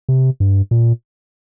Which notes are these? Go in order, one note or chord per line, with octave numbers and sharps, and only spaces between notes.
C3
G2
A#2